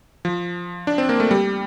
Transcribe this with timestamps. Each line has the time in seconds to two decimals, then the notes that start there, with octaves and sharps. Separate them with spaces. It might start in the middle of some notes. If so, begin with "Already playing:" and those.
0.25 F3
0.87 D4
0.98 C4
1.09 A#3
1.20 A3
1.31 G3